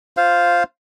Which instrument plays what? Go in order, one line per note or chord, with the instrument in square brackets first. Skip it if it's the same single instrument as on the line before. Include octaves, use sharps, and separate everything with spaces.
[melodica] F4 C5 F5